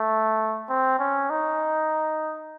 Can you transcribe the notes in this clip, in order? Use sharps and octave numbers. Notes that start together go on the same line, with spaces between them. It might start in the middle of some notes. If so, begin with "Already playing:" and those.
Already playing: A3
C4
C#4
D#4